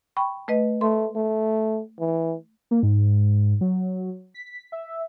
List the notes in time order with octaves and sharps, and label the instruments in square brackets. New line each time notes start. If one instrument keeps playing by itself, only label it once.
[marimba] G5 B5 C#6
A3 B4 D#5
[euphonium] A3 [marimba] C6
[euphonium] A3
E3
[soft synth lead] A#3
G#2
F#3
B6
E5